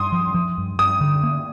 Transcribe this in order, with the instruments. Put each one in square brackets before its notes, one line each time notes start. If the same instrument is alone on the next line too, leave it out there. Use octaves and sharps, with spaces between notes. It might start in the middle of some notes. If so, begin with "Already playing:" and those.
Already playing: [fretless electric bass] G2 [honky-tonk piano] C6 D#6
[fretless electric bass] F3
F3
G2
[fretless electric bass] G2 [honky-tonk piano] D#6
[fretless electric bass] D3
A#3